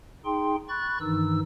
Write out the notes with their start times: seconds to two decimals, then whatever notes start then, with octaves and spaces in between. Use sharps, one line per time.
0.25 D#4 G#4 G5 C6
0.69 B5 C#6 F#6 A6
1.01 G2 D#3 E3 D#4 E6